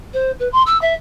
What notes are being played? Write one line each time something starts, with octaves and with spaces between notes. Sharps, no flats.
C5
B4
C6
E6
E5